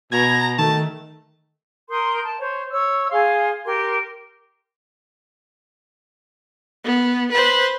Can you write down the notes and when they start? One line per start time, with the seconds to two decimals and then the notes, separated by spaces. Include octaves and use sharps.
0.12 B2 A#5 G#6
0.58 D#3 A3 A5
1.89 A#4 C6 D#6 G6
2.24 A5
2.39 C5 C#5
2.70 C#5 E6
3.10 G#4 F5 C6
3.64 G4 A#4 C6
6.84 B3
7.32 B4 C5